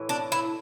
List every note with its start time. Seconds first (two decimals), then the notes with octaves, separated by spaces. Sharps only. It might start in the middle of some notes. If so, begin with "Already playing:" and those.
Already playing: A2 E3
0.09 D4
0.32 E4